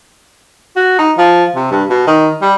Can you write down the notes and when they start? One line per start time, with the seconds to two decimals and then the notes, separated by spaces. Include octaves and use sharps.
0.76 F#4
0.98 D#4
1.17 F3
1.55 C3
1.71 G2
1.90 B2
2.07 D#3
2.42 G3